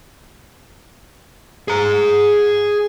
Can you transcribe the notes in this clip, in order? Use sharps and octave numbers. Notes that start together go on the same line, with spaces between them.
G#4 A#5